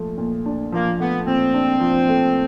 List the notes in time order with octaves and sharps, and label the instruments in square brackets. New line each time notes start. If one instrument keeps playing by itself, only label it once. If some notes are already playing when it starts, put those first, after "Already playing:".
Already playing: [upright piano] A#2 F3 A3
A#2
D4
[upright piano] F3 [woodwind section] A#3
[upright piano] A3 [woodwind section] B3
[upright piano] A#2 [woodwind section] C4
[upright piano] D4
F3
A3